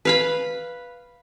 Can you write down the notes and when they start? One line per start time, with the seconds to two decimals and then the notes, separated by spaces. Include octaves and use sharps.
0.05 B4 F5 B5